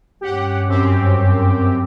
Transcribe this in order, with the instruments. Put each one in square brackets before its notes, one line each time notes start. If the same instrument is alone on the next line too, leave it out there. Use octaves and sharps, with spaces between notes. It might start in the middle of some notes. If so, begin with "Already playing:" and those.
[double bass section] G2 C#4 [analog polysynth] G4 F#5
[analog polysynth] F#2 C4 G4